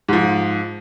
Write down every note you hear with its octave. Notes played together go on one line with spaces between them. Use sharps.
G#2 F3